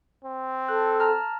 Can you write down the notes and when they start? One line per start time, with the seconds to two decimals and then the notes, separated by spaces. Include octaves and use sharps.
0.25 C4
0.68 A4 F#6
1.00 A5 A#5 F6